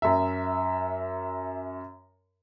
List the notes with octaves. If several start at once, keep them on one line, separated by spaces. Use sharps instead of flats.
F#2 E5